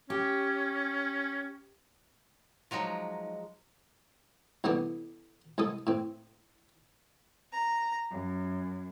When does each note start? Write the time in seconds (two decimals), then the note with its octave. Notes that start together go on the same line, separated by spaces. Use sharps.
0.10 C#4 G4
2.71 F3 F#3 G#3 D#4
4.64 C2 D3 E3 B3 D4
5.58 C2 G#3 A4 D#6
5.87 A2 C4
7.51 A#5
8.13 F#2